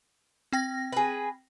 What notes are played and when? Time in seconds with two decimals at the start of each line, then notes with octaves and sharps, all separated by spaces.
0.53 C4 G5 A#6
0.92 G#4 B4